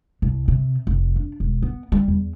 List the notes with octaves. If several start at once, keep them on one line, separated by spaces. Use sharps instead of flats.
C2
C3
F1
D4
E1
B3
G3
E2